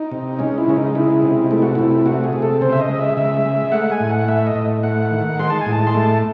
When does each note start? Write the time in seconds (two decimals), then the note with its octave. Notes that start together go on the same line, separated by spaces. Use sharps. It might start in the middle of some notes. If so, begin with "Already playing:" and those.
Already playing: D#4
0.12 C3
0.39 G#3 C#4
0.58 E4
0.68 C#3 C#4
0.76 D#4
0.95 G#3 E4
1.22 C3
1.51 A3 E4
1.62 F#4
1.75 C3 E4
2.06 A3 F#4
2.24 G#4
2.33 C3
2.42 A4
2.61 C#3 C5
2.72 E5
2.80 D#5
2.89 G#3
2.99 E5
3.17 C#3 E5
3.45 G#3
3.72 A3 F#5
3.91 G#5
4.00 A2
4.10 F#5
4.28 A3 E5
4.46 D#5
4.55 A2
4.83 A3 F#5
5.11 D#3
5.39 G#3 C6
5.50 A5
5.61 G#5
5.66 A2
5.73 A5
5.87 C6
5.94 A3 A5